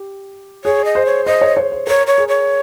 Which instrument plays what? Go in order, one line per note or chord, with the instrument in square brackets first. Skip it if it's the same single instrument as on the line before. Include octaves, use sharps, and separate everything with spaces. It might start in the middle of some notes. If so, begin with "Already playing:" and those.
Already playing: [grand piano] G4
[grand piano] G#4 [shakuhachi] C#5
[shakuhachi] D#5
[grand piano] C5
[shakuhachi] C#5
[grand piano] C5 [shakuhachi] D#5
[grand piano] C#5
C#5
C5
[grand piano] A#4 [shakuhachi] C#5
[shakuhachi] C#5
[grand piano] G#4
[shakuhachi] C#5